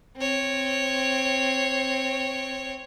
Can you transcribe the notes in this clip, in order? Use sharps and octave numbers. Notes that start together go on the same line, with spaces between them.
C4 C#5